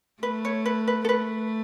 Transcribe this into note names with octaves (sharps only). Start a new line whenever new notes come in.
A3 B4
C#5
B4
B4
A4
A3 B4